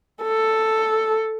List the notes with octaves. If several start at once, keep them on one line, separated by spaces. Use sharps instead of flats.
A4